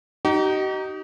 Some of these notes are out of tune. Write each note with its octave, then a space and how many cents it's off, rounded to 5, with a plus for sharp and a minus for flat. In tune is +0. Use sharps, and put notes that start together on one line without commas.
D#4 -5 G4 -45